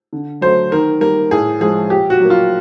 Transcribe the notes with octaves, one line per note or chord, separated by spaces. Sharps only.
D3
F#3 A3 C5
D#3 A#4
G3 A#3 A#4
A2 G#4
F3 G#3 G#4
A#2 G4
F#4
F#3 A#3
F4